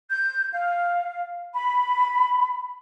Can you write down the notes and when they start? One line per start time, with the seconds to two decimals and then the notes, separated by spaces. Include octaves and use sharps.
0.08 G6
0.52 F5
1.53 B5